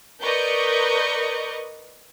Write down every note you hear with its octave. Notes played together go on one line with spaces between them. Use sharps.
A#4 B4 D5 D#5 C#6 G6